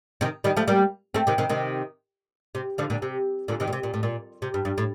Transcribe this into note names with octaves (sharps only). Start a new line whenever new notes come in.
C3 D#3
D#3 G3
F3 A3
G3 A#3
A3 C4
C3 D#3
C3 D#3
C3 D#3
C3
D3 F3
A#2 D3
C3
A#2 D3
C3 D#3
A#2
C3
A#2
A2
A#2
C3
G2
G2
A2